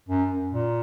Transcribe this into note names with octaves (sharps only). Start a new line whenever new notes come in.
F#2
A#2